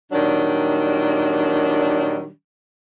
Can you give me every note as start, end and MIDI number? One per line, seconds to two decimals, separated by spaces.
0.12 2.30 46
0.12 2.30 51
0.12 2.30 54
0.12 2.30 55
0.12 2.30 62
0.12 2.30 63